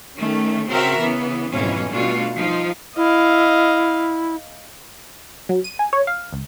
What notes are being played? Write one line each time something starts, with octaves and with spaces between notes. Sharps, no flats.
D#3 A3 C#4
C#3 C4 F#4 A#4 E5
C#3 E3 B3
F2 G#2 B2 E3 F#3 C#4
B2 G3 A3 D4 F4 F#4
F3 D#4 F4
E4 D#5 F5
F#3
D#7
G#5
C#5
F5
C#2